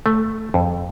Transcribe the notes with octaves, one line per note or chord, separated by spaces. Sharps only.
A3
F2